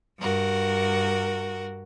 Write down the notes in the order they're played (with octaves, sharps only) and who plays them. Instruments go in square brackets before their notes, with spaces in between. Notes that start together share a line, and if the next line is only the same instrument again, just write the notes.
[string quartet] G2 F#4 A#4